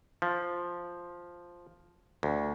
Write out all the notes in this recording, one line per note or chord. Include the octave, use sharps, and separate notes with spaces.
F3
D2